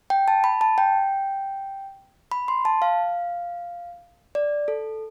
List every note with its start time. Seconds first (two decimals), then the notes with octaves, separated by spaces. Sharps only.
0.10 G5
0.28 A5
0.44 B5
0.61 A5
0.78 G5
2.32 B5
2.48 C6
2.65 A5
2.82 F5
4.35 D5
4.68 A4